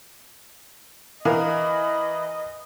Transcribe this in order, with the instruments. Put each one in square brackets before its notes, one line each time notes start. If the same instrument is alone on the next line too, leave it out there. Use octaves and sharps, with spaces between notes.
[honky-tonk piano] E3 [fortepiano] A#4 F5 [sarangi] D#5 [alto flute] B5